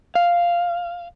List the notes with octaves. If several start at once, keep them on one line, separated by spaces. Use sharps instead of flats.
F5